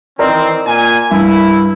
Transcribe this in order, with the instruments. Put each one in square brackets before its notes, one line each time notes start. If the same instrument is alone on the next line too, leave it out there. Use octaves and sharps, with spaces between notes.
[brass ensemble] D#3 E3 C4 [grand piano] A#4 D5 D#5
[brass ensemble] A#2 A#3 G#5
[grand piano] G2 [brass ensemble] E4